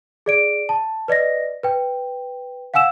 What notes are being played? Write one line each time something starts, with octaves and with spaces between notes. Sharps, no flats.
G#4 D5 D7
A5
B4 D5 D#5 A#6
B4 G5
F5 F#5 G#5 E6 E7